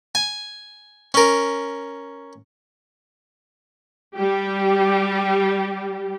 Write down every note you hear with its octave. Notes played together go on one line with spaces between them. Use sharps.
G#5
C#4 A#4
G3 G4